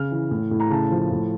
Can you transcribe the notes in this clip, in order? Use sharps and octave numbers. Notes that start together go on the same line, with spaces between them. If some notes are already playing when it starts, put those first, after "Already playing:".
Already playing: C#3 F6
E3
A2
A2
A#5
C#3 A5
F3
A2